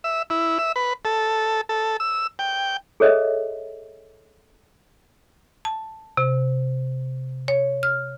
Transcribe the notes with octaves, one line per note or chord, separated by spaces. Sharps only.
E5
E4
E5
B4
A4
A4
E6
G5
G#4 A4 C#5 D#5 E5
A5
C3
C#5
F6